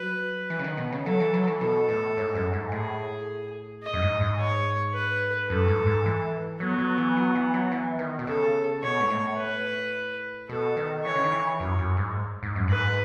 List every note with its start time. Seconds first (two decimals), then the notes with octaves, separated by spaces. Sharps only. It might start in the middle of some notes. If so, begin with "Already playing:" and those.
Already playing: F#3 B4
0.50 E3
0.59 C#3
0.64 D#3
0.77 B2
0.92 C#3
1.06 F#3 A4
1.20 E3
1.34 F#3
1.47 E3
1.61 B2 A4
1.88 A2
2.17 G#2
2.35 F#2
2.53 G#2
2.72 A2 G#4
3.83 D#5
3.93 F#2
4.02 G#2
4.21 G#2
4.39 C#5
4.94 B4
5.50 F#2 A4
5.68 G#2
5.86 G#2
6.06 E3
6.60 F#3 B3
6.78 F#3
6.98 E3
7.17 F#3
7.35 E3
7.54 F#3
7.72 E3
7.99 D#3
8.19 B2
8.27 C#3 A4
8.83 B2 C#5
9.00 G#2
9.10 A2
9.38 B4
10.49 B2 A4
10.77 D#3
11.04 E3 C#5
11.15 C#3
11.24 D#3
11.32 E3
11.60 F#2
11.79 F#2
11.97 G#2
12.43 G#2
12.55 F#2
12.68 G#2 B4